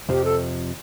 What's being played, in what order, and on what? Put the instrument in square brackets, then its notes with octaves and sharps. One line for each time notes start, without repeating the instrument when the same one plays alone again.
[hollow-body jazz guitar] F2 C3 F3 [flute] G4
[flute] A4